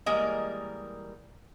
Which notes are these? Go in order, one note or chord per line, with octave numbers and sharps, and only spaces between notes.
E3 G3 G#3 A#3 A#4 D#5